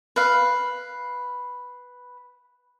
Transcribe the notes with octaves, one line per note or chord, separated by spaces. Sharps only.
B4 F5